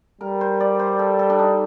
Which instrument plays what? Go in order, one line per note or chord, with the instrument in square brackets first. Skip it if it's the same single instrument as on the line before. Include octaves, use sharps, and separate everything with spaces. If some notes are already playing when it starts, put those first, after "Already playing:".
[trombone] G3 [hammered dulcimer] A#4
[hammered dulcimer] C5
D5
C5
A4
A4
D4
D#4